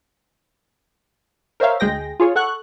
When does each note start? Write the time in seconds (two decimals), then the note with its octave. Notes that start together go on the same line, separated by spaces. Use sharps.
1.60 A#4 C5 C#5 E5 F5
1.80 D2 G#3 G#4 G5 A#6
2.20 F4 G#4 C#5
2.36 A4 F#5 C#6 F#6